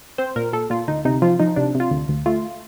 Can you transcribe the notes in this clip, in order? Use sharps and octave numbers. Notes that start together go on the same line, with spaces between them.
C4 C5
A#2 A#4
A#2 A4
A#2 F4
D2 D#4
C3 D#4
F3 F4
F3 D#4
C3 D4
C3
F4
D2
D2
A3 F4